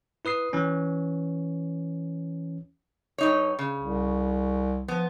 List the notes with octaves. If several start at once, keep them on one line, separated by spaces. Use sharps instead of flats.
E4 B4 D#6 C7
E3 C#4
G2 D#4 C#5
C#3
C2
F3 B3